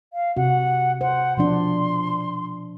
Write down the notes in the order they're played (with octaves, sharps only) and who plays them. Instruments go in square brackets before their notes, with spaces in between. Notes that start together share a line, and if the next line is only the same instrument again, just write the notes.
[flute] F5
[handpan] C3 F#4 [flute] F#5
[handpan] C5 [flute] F#5
[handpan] B2 F3 D4 [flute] C6